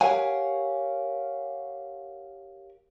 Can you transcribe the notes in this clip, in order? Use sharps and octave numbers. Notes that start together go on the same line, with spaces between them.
G4 A#4 C#5 F5 F#5 G#5